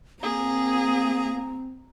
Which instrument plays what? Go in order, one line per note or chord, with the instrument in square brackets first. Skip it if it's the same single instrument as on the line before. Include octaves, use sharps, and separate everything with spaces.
[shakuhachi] A#3 [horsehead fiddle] C4 [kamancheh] G#4 [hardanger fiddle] A#5